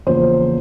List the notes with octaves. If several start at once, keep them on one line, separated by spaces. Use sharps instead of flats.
E2 C#3 F3 A#3 C5